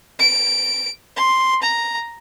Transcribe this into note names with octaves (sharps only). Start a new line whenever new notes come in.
D7
C6
A#5